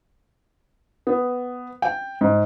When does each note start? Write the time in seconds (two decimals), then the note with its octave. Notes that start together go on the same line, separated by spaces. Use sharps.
1.07 B3
1.82 G5
2.21 G#2